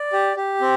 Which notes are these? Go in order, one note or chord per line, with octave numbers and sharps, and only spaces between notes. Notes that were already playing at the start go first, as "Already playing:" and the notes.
Already playing: D5
G4
G4
C4